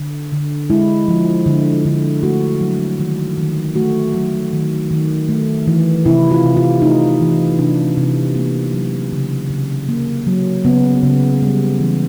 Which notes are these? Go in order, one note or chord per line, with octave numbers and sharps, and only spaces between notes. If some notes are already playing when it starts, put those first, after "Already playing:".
Already playing: D3
D3
G#3 E4
F3
D3
D3
A3 F#4
F#3
D#3
D#3
A3 F#4
F#3
D#3
D#3
A3
E3
C3 E4
F4
C3
F4
A3 D#4
E3
C3 D4
C3
A#3
F#3
C#3
C#3
A#3
F#3
C#3 B3
C#3
G3
E3